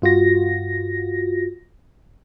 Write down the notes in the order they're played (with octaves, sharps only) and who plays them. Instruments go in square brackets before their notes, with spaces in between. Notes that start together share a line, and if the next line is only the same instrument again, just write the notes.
[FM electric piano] G2 F4 F#4 A#6